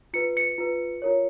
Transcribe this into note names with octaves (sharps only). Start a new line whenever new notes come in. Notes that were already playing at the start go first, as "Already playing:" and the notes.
F4 B4 C#7
C#7
F4 B4
F4 A#4 C#5